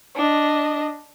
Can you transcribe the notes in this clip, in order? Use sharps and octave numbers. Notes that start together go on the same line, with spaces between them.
D4 D#5